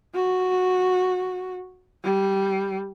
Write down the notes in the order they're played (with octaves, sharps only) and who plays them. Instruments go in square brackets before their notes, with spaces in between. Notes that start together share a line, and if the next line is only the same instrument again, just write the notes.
[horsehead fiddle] F#4
G3